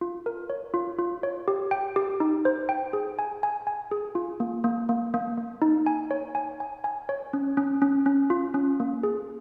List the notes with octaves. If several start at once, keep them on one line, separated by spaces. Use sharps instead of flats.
F4
A#4
C#5
F4
F4
C#5
G4
G5
G4
D#4
C5
G5
G#4
G#5
G#5
G#5
G#4
F4
A#3
A#3
A#3
A#3
A#3
D#4
G#5
C#5
G#5
G#5
G#5
C#5
C#4
C#4
C#4
C#4
F4
C#4
A#3
G#4